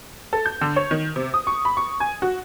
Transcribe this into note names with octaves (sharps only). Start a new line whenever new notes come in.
A4
G6
D3
C#5
D#3
C3
D#6
C#6
B5
C#6
G#5
F#4